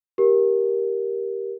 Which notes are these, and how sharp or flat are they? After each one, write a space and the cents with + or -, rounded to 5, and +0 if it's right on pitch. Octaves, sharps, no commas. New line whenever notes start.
G4 +0 A#4 +15